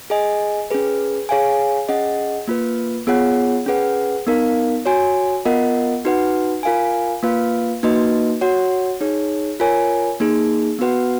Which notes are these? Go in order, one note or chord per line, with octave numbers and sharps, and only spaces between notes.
G#4 D#5 G#5
C#4 G#4 B4
G#4 C#5 F5 G#5
C#4 G#4 D#5 F#5
A#3 F4 B4
B3 F4 G#4 C#5 F#5
C#4 G#4 B4 F#5
B3 D#4 A#4 F5
F#4 C#5 G#5
B3 F4 A#4 D#5 F#5
D#4 F#4 B4 F#5
F4 A#4 F5 G#5
A#3 F4 B4 F5
A#3 D#4 F#4 B4 D#5
F#4 C#5 F#5
D#4 G#4 C#5
F4 A#4 C#5 G#5
A#3 D#4 G#4
B3 F#4 B4 F#5